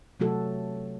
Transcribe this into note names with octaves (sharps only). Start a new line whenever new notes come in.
C3 F#3 A3 F#4 A4